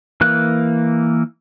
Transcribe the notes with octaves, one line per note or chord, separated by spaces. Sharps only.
E3 A#3 F#6